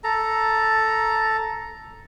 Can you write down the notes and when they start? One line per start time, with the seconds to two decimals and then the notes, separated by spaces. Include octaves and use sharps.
0.04 A4 A#5